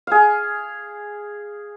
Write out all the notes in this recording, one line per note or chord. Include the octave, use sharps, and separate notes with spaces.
G#4 F5